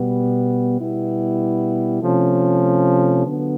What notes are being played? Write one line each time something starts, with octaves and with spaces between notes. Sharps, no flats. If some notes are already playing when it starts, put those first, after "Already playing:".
Already playing: B2 G3 B3
B2 G3 B3 E4
C3 F3 A3 C#4
D3 F#3 B3